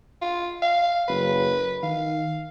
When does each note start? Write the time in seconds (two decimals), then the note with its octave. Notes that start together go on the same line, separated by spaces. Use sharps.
0.22 F4
0.62 F5
1.08 F#1 B4
1.83 D#3 F5